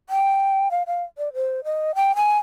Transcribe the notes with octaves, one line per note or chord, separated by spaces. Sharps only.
G5
F5
F5
D5
C5
D#5
G5
G#5